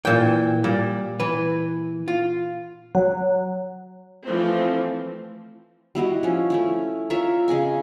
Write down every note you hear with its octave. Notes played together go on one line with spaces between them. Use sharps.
A#2 E3 G5
A#2 G3
E3 B4
F4
F#3
E3 F3 A3 C4
G3 E4 F#4 D#5
F3 C#4
A3 C#4 E4
F4 A#4 C#5 E5
C#3 G#4 D#5 G#5